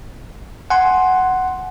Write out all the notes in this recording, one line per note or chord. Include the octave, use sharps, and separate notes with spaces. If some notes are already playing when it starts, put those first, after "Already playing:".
F#5 G#5 C6